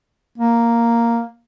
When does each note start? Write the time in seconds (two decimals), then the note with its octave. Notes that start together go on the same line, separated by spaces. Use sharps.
0.38 A#3